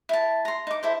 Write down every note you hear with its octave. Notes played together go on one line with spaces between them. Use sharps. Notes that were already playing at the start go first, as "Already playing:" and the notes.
E4 A5
A#5 C6
D#4 D6
E4 A4 C5